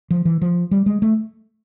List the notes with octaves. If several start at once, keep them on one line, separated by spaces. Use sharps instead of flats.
F3
E3
F3
G3
G#3
A3